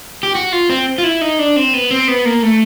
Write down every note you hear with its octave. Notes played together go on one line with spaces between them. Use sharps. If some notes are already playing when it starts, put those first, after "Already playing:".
G4
F#4
F4
C4
F4
E4
D#4
D4
C4
B3
C4
B3
A#3
A3